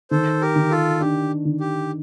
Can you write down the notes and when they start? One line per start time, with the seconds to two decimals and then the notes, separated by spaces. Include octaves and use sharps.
0.11 D#3 A4 C5
0.41 G4 A#4
0.56 D#3
0.70 F4 A4
1.00 D4 G4
1.45 D#3
1.60 G4